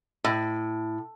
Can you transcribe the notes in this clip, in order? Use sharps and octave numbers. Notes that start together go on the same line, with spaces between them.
A2